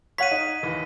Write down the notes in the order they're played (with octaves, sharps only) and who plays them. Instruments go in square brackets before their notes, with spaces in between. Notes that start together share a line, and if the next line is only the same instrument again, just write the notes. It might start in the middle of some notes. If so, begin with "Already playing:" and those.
[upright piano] C#5 F5 F#5 [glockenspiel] B6 D#7
[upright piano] D#4
D#2 E3